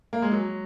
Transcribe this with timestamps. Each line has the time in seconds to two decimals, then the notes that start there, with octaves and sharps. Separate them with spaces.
0.13 A#3
0.22 G#3
0.32 F#3